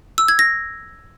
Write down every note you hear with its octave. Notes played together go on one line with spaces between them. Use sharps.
E6
G#6
A#6